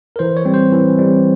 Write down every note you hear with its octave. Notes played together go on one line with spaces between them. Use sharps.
A#4
E3 C5
C#5
G3 C4
C5
E3
G3 C4